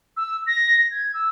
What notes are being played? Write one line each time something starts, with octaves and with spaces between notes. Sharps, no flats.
E6
A#6
G#6
E6